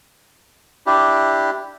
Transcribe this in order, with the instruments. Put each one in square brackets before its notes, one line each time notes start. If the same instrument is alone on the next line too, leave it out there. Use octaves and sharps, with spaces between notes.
[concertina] D4 E4 G4